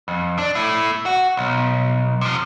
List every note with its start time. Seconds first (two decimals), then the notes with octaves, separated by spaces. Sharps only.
0.08 F2
0.38 D4
0.55 A3 E4
1.06 F#4
1.37 B1
2.21 C3 F3